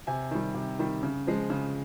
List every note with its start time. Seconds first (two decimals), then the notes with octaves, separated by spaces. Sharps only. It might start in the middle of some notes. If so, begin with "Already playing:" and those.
0.07 C3 G#5
0.31 D#3 G3
0.55 C3
0.79 D#3 G3
1.03 C#3
1.27 F3 G#3
1.50 C#3